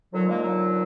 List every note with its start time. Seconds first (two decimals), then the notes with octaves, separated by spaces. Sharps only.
0.13 D#2 D3 F3 F#3
0.27 G#3 A#3
0.42 F#3